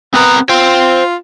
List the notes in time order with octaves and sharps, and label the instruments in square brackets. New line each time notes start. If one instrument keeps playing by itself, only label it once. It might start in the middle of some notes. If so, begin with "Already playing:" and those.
[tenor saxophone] B3 [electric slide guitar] C4 A#4 A#5
[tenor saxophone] F4 [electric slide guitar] C5 G5